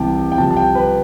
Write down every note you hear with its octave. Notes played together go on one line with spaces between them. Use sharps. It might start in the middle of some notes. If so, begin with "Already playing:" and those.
Already playing: C2 C3 E3 G5 A5
G5
C2 C3 F3 A5
A5
G5
B4